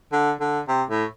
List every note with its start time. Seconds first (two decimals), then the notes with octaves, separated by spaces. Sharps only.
0.12 D3
0.40 D3
0.68 C3
0.90 A2